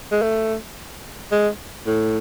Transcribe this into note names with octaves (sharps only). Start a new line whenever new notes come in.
G#3
A3
G#3
A2